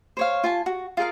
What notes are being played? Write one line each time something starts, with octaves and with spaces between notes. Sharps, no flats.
C5 C#5 F5
F4 G#5 A5
F#4
F4 G#4 A#4 F5